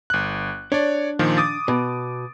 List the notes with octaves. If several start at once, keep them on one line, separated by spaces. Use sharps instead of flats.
G1 F#6
D4 C#5 D5
A#2 D#3 F3
D6 D#6 A6
B2